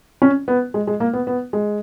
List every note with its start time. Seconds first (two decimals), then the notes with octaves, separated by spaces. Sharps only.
0.22 C#4
0.48 B3
0.74 G#3
0.87 G#3
1.00 A#3
1.13 B3
1.27 B3
1.53 G#3